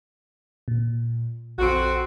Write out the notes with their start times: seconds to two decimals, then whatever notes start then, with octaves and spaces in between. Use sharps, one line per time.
0.68 A#2
1.58 A#1 F2 C4 F#4